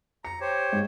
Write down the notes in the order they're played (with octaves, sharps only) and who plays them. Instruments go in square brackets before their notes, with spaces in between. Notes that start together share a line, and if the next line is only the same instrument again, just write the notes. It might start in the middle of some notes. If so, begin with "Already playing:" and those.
[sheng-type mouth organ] A#5 [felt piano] C#7
[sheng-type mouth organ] G4 C5 C#5
[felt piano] G#2